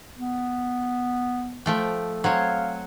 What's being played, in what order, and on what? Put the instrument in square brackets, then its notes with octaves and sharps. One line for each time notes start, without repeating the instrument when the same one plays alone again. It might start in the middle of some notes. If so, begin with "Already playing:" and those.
[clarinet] B3
[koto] F3 A3 G5
[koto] F#3 C4 C#5 [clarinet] F5